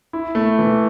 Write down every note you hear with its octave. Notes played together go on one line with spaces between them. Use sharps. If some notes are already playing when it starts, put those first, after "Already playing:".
E4
A3
E3